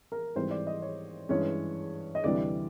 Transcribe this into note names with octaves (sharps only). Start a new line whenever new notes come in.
A#4
G#2 E3 G3 C4 C5
D5
D#5
C#5
G2 E3 G#3 C#4 C#5
D#5
D2 C3 E3 G3 D5